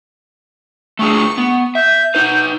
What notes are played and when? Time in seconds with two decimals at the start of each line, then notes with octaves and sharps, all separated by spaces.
0.99 A3 D4 G#4 C#6
1.38 B3
1.75 E5 G6
2.15 D#4 B4